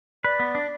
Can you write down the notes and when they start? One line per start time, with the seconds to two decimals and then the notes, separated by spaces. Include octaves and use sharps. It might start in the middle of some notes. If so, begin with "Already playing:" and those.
0.24 B4 D5
0.40 B3
0.55 D4